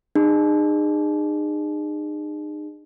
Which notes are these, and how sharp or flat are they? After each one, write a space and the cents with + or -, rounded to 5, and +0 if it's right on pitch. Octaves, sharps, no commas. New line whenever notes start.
D#4 -40 G#4 -25